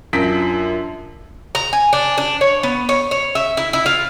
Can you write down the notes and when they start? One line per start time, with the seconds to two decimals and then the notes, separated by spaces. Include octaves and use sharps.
0.13 F#2 D4 F4 B6
1.55 A#5
1.73 G#5
1.93 D4
2.18 D4
2.41 C#5
2.63 B3
2.89 C#5
3.11 C#5
3.35 E5
3.57 E4
3.73 E4
3.86 F4